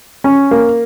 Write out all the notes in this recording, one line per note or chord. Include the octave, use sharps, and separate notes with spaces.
C#4
A#3